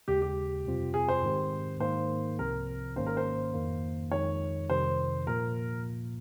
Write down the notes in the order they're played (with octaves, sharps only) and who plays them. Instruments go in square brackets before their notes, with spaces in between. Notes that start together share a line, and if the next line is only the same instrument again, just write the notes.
[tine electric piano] D#2 C#3 G#3 [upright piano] G4
[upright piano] G4
[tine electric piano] F2 C3 G3 C4 F4
[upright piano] G#4
C5
[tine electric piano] G#2 D#3 G#3 C4 G4
[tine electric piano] G#2 D#3 A#3 D#4 [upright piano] C5
[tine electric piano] C2 C3 F3 C4 [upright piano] A#4
[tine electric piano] G#1 G#2 D#3 A#3 C#4 [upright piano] C5
[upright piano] A#4
C5
[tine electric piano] F2 D#3 A#3
[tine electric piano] F2 D#3 G#3 D#4 [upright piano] C#5
[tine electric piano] F2 C3 D#3 G3 [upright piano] C5
[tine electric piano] A#2 F3 A#3 [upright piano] A#4